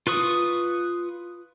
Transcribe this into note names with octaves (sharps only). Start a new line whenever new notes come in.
F4 B4 C#6 D#6